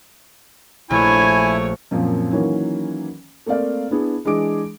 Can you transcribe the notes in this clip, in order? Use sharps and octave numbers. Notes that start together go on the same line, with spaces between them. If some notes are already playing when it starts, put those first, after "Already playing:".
A#1 A3 E4 C#5 G#5
F#2 A#2 F3 C4
D#3 E3 F#3 A#3 C#4
A3 A#3 C4 D5 F5
B3 D4 E4 G#4
E3 G#3 D4 G#4 D6 D7